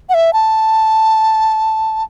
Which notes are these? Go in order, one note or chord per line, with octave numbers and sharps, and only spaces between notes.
F#5
E5
A5